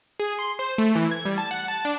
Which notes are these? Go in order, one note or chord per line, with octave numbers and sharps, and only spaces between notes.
G#4
C6
C5
A3
E3
G#6
G3
A5
F#5
A5
D4